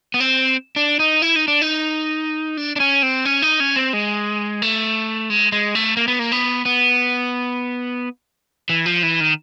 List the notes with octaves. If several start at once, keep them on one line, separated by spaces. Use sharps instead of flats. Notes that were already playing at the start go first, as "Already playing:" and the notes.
B3
C4
D4
D#4
E4
D#4
D4
D#4
D4
D4
C#4
C4
C#4
D#4
C#4
C4
G#3
A3
G#3
G#3
A3
A#3
B3
A#3
B3
B3
E3
F3
E3
D#3